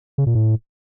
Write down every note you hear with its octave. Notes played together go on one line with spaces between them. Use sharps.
C#3
A#2
A2